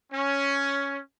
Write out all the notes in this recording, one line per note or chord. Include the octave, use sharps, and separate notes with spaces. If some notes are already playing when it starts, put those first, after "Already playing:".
C#4